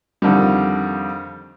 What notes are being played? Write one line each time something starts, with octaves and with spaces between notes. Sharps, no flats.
F2 D3 D#3 G3